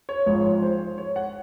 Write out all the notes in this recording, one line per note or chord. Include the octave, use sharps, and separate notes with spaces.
C#5
G#1 G#2 F3 C#5
C5
C#5
F#5